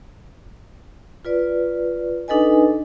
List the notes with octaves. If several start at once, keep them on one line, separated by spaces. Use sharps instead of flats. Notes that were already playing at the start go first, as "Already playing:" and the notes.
F4 B4 D5
D4 D#4 A4 B4 D#5 G#5